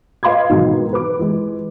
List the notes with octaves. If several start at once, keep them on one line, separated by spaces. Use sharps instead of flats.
B4 D#5 F5 C6 D6 G#6
G#2 B2 D#3 E3 F#3 D#4
B4 D6
E3 G#3